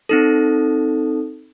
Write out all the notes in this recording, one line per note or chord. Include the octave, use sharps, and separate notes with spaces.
C4 D#4 A4